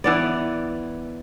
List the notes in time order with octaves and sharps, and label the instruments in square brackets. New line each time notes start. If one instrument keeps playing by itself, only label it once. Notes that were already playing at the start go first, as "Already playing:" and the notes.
[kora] E3 B3 D5